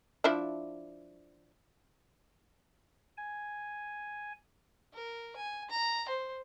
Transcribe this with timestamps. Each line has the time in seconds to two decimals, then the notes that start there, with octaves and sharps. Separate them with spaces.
0.24 F3 D4 E4
3.17 G#5
4.94 A#4
5.36 G#5
5.70 A#5
6.08 C5